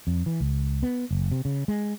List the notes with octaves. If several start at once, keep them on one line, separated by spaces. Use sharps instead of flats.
F2
E3
C#2
B3
F#1
C3
C#3
G#3